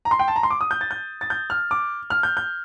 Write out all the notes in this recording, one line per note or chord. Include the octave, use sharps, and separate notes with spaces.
A#5
C6
G5
A5
A#5
C6
D6
D#6
G6
A6
G6
A6
G6
F6
D6
F6
G6
G6